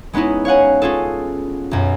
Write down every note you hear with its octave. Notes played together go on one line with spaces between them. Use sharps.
G#3 B3 C#4 D#4 E4
C#5 F5 F#5 G#5
C#4 F4 G#4 A4
B1 F#2